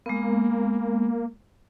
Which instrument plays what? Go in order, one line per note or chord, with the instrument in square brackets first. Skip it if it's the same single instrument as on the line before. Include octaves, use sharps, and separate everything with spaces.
[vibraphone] G#3 B3 [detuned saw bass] A#3